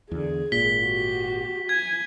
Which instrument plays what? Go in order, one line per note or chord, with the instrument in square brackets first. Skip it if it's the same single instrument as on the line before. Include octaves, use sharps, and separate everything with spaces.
[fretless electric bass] E2 D3 [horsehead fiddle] G#4
[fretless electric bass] G#1 A#2 [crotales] B6 G7
[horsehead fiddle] F#4 G4
[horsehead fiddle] G#5 [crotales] G#6